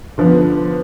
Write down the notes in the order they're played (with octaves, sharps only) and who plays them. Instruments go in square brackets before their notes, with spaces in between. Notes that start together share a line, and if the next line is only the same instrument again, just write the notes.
[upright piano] D3 F3 B3